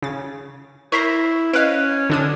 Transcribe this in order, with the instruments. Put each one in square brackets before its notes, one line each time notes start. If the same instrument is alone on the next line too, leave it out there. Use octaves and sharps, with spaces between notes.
[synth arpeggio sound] C#3 A6
[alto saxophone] E4 [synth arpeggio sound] A#4 C5 A#5 [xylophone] C#6 B6 C7
[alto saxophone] C#4 [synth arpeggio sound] B4 F5 [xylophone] D#5 F#6 D7
[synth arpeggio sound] D3 D4 D#6